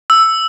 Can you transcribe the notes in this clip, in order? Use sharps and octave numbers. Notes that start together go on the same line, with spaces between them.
E6